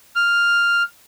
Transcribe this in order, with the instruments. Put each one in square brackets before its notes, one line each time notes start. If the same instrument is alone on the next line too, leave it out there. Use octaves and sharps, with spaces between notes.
[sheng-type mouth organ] F6